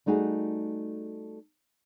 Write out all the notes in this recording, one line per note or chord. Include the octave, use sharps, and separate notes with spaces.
G3 A3 D#4 F#4 G#4